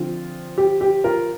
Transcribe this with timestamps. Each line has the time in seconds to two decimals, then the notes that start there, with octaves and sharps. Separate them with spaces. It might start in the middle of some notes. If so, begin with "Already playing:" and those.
Already playing: D3 F3 C4 F4
0.58 G4
0.81 G4
1.04 F4 A#4